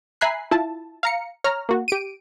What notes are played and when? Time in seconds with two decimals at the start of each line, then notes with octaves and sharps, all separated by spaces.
0.21 E5 G#5 A#5 B5 F#6 C7
0.51 E4 F4 A5
1.03 F5 A#5 C#7
1.44 C#5 A#5 F6
1.69 A#3 F#4
1.88 G4 D7 D#7